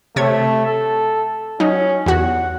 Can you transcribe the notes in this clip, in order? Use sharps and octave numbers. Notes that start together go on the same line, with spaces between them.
C3 A3 C#5 G#6
A4
F#3 C#4 D#4
E2 F#4 F#5